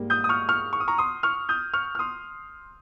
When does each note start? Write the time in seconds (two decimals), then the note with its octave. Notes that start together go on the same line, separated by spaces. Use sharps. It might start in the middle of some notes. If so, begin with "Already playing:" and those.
Already playing: G#2 G3 A#3
0.10 D#6 G6
0.24 D#6
0.29 C#6 F6
0.49 C#6 F6
0.73 C#6
0.80 D#6
0.88 A#5 C#6
0.98 C6 D#6
1.23 C#6 F6
1.49 D#6 G6
1.74 C#6 F6
1.95 F6
1.99 C6 D#6